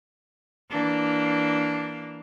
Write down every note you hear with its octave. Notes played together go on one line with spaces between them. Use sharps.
E3 A#3 D4